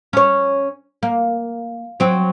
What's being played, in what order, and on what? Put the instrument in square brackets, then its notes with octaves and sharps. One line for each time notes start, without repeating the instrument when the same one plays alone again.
[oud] C#4 C#5
A#3
F#3 C4